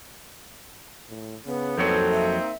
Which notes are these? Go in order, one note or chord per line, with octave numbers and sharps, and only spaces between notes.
A2
C#3 B3
F2 F#3 A#3 C4 D#4 A4 C#5
E5